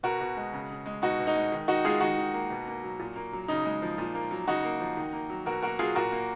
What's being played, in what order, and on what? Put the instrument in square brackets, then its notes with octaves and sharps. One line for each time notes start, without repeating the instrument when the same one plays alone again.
[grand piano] B2 F#4 A#4
B2
G#3
C#3
C#3
G#3
B2 D#4 F#4
B2
D#4
G#3
D#3
D#3 D#4 F#4
G#3 F4 G#4
D#3 D#4 F#4
D#3
A#3
B2
A#3
F#3
A#2
A#3
F#3
C#3 D#4
G#3
F3
A#2
A#3
F#3
C#3 D#4 F#4
A#3
F3
D#3
A#3
F#3
B2 F#4 A#4
A#3 F#4 A#4
F#3 F4 G#4
A#2 F#4 A#4
A#3